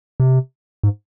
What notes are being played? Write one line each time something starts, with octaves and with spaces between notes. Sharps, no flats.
C3
G#2